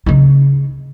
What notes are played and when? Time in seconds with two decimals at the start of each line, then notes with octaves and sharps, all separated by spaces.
0.06 C#3 D#4